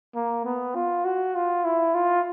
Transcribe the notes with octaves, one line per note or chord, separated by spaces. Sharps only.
A#3
B3
F4
F#4
F4
E4
F4